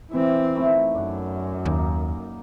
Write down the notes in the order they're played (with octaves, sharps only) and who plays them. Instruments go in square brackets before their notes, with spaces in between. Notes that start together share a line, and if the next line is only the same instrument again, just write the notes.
[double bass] E3 C4 [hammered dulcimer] E5 D6
[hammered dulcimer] D#3 A3 E4
[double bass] F#2 [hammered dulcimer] D5 F#5
[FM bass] D#2 [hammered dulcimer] A#3 D#4